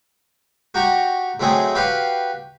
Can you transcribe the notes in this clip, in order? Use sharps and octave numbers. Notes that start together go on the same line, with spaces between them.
F#4 G4 A#5 C#6
G#2 F#3 A3 C4 G#4
F#4 G4 B4 F5